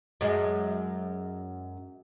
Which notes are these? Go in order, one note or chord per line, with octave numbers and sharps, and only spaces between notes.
F#2 G#3